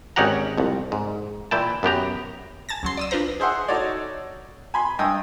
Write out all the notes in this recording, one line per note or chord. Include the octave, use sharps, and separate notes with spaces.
G#1 C#4 D#4 G4 F#5 A#5
C2 F2
G#2
A#2 E3 E4 G5 A5
F#2 B3 G4 A#5
G#5 A5 A6 A#6
C#2 F#3 C6
D5 D#6 E6
D4 F4 B4 C5 A#5
G#4 C5 E5 F#5
D#4 F#4 A4 C#5 D5
G#5 B5 C6
G2 D#5 G5 G#5 D#6 E6